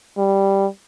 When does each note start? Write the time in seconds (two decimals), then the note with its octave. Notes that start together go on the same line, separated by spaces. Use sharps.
0.17 G3